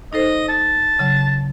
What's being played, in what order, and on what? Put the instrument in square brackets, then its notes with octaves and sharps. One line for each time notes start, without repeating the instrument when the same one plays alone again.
[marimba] D#4 A4 C5 [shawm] D#5
[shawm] A5
[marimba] C#3 F#3